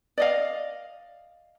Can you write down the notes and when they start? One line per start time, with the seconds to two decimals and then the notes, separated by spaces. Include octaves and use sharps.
0.18 D5 D#5 F5